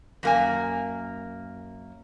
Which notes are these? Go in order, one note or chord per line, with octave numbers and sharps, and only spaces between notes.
F#2 A#3 G#5